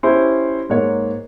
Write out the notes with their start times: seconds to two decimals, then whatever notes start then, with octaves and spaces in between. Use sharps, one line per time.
0.03 C#4 E4 G4 C5
0.70 G#2 A#3 C#5